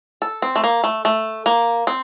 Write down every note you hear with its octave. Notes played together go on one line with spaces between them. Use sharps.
A4
C4
A3
A#3
A3
A3
A#3
C4